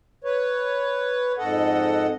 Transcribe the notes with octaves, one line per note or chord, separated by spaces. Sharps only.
B4 C#5
F2 G#2 A4 D#5 F#5